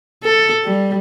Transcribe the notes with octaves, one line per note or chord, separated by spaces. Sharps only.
A4
G3